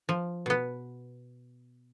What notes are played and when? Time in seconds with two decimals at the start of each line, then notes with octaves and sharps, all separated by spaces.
0.09 F3
0.46 B2 B3